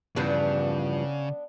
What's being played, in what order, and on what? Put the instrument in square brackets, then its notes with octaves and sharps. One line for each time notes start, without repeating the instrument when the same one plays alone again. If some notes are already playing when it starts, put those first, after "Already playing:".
[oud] E2 G2 F3 [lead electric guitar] C#3 [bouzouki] B3 D4